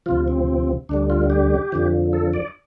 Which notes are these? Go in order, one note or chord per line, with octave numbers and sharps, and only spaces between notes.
D2 C3 F3 F4
C4
D2 D3 G3 D4
F4
G4
F2 D3 F3
A4
D5